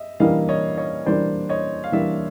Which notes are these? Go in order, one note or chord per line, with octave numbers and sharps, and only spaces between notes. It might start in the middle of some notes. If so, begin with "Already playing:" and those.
Already playing: D#5 E5
E3 G3 A#3 D4 D#5 F5
C#5 D#5
C#5 D#5
E3 G3 A#3 D4 C5 D5
C#5 D#5
F5
E3 G3 A#3 D4 D5 E5